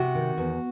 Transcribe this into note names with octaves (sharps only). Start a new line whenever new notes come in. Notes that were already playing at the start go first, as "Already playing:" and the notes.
Already playing: C3 F#4
D#3
E2